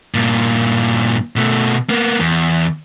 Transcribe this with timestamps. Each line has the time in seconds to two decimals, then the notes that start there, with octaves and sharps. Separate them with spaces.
0.14 G2 A#2
1.36 B2 A3
1.89 A#3 B3
2.20 E2